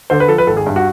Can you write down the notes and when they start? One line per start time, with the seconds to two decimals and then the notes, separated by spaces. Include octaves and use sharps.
0.10 D3 C5
0.20 B4
0.29 F3 A4
0.38 B4
0.47 G#1 A4
0.57 G#4
0.66 G2
0.76 F#4